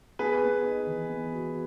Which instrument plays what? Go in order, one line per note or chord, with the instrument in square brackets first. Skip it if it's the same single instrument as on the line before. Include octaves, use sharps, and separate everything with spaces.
[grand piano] B3 [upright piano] G#4 B4
[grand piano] B3
D#4
E3
B3
F#4